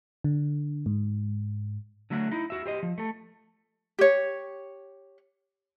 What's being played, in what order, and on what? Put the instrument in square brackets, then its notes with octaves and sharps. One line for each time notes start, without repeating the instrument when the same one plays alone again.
[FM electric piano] D3
G#2
[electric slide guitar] D3 F#3 A3 E5 F#5
D#4 E4
F#4 E5
G4 C5 D#5
F3
A3 A4
[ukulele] G4 C#5